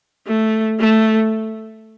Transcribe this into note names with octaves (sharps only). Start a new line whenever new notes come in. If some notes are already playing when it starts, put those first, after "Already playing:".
A3
A3